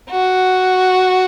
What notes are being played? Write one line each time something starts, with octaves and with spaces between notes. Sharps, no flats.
F#4